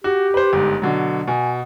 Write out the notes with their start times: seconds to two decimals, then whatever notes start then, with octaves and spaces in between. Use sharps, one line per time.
0.04 F#4 G4
0.34 B4 C5
0.53 G1 G#2
0.82 B2 D3 F#3
1.28 B2 G#5